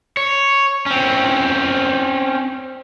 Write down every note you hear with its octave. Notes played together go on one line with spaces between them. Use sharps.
C#5
C4 C#4